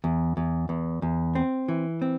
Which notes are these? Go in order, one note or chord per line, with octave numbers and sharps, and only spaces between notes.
E2
E2
E2
E2
C4
E3
C4